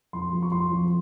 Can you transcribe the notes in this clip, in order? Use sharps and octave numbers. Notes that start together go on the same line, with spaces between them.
F2 C6
F3
C#6
F3 C6
F2